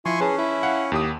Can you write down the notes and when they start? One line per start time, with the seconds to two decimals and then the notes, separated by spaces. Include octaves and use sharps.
0.05 F3 E4 G#5 C6 C#6
0.20 C#4 G#4 B4 A5
0.38 E4
0.63 F5 F#5
0.92 D#2 G4 D#6